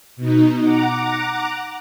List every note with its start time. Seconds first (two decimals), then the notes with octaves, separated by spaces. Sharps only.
0.17 B2 D#4
0.62 F#5 A#5 D6